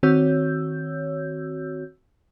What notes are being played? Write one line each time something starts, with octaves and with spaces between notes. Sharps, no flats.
D#3 C4 F#4 C#5 E6 G6